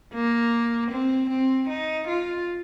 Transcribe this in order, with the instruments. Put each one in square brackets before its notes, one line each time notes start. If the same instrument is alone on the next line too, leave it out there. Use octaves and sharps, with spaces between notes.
[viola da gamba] A#3
C4
C4
D#4
F4